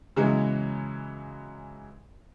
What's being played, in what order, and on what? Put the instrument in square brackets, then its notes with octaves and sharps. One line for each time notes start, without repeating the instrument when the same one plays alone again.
[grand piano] C#3 E3 F#3 G#3 B3